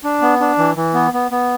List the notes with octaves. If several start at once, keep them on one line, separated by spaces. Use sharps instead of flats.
D4
B3
D4
E3
E3
B3
B3
B3